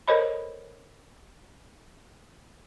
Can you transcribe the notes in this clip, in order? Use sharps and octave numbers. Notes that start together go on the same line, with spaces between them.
A4 A#4 C5 C#5 D#5 B5